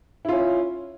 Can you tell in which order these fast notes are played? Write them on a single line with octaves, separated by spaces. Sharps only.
E4 F4 C#4